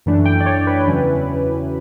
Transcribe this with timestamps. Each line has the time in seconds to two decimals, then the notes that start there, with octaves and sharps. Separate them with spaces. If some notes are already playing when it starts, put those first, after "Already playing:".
0.06 F#2 E3 A3 D4
0.26 G5
0.40 D5
0.46 C#5
0.67 B4
0.87 E2 C#3 F#3 C#4 E4